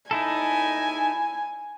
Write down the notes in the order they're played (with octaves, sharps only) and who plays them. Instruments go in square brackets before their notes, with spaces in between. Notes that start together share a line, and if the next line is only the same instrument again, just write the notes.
[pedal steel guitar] D#4 E4 A4 [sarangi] G#5